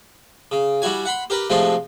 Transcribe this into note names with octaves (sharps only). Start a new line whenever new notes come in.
C#3
G3 E4 F#4 G#5
F#5 B5 C6
G4 A#4 B4
C3 F3 G#3 A3 C4 D4